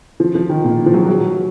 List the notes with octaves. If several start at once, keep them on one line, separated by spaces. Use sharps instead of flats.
F3
F3
D#3
A#2
F3
F#3
F#3